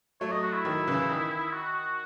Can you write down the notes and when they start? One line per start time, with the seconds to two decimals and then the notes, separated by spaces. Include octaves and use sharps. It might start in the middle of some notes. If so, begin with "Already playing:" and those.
0.20 F#3 A3 C#5
0.32 D#5
0.43 F#4
0.53 E4
0.65 D#3 F#3
0.87 C#3 E3
1.09 D#3
1.53 F#4